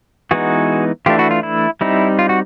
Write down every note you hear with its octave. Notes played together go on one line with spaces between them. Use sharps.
E3 G#3 B3 D#4 F#4 G#4
E3 A3 D4 F4 G4
E4 F#4
F4
E4
G3 C4 D#4 E4
F4
F#4